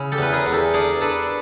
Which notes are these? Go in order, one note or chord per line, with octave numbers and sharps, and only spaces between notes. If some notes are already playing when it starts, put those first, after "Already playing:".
Already playing: C#3 E4
G4 A4
E2 B4
G#4 A#4
E2
G4 A4
D4 G#4 A#4
D4 A4 B4